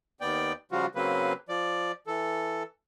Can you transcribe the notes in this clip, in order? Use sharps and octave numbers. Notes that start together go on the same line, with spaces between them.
D#2 B3 D5 G5
C#3 F3 G3 F4 F#4
C#3 F#3 A#3 C4 B4
F3 D5
E3 A4